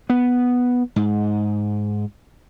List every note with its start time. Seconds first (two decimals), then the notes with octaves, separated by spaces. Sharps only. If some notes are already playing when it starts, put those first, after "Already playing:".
0.10 B3
0.96 G#2